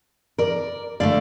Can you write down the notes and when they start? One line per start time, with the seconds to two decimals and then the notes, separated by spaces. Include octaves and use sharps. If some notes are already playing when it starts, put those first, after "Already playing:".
0.38 A#4 D5
1.00 D3 A3 D5 F5